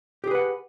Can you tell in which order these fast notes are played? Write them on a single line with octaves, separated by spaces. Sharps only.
G4 G#4 B4 F#5